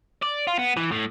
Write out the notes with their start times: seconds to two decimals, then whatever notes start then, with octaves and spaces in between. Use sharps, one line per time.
0.22 D5
0.47 F4
0.59 B3
0.77 E3
0.92 A2